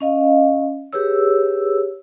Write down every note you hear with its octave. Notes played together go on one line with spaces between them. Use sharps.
C#4 D#5 F5
G4 G#4 B4 C#5 E6